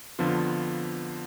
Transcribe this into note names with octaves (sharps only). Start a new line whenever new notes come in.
F2 D3 F3 B3 F4